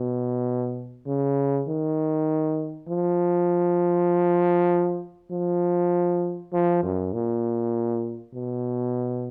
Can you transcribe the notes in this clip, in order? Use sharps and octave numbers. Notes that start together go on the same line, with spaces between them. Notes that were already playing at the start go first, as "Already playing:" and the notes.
Already playing: B2
C#3
D#3
F3
F3
F3
F#2
A#2
B2